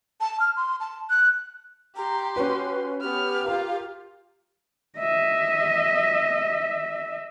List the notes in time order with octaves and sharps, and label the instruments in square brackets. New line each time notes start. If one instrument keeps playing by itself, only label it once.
[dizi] A5
F6
C6
A5
F#6
[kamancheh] G4 C6 [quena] A#5
[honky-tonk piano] C#4 B4 [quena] F#4
[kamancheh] B3 F6 [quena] G4
[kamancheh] F4 F5 [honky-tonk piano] A#4
[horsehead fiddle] D#5 E5